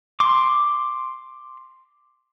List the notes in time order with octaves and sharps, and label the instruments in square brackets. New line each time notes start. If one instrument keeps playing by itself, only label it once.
[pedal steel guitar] C6 D6